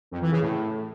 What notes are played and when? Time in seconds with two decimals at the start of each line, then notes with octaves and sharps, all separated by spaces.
0.11 F2
0.21 E3
0.32 C#3
0.42 A2